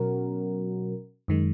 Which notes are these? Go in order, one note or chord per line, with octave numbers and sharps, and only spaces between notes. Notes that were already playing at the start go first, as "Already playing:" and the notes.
Already playing: B2 F#3 C#4 F#4 A#4
F#2 D#3 G#3